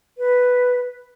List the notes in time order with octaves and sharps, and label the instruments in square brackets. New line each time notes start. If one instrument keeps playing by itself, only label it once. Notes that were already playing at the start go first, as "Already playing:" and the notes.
[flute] B4